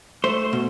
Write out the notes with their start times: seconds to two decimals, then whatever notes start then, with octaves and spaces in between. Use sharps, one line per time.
0.24 A3 C5
0.53 B2